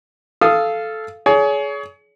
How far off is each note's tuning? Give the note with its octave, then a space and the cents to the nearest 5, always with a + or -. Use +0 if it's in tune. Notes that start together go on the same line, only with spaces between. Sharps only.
A4 -10 F5 -15 D#6 +0
G#4 +25 C#5 +35